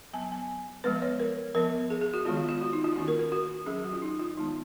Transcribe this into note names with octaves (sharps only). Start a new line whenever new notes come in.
F#3 B3 G#5
G#5
F3 G#3 B3 B4
C#5
A#4
F3 B3 A#4
G#4
G#4
F#4
D#3 G#3 B3 F4
F4
F4
F#4
D#4
F4
D#3 A#3 C#4 F#4
A#4
A#4
F#4
F#3 C#4 G#4
F#4
F4
D#4
F4
D#3 G#3 B3 D#4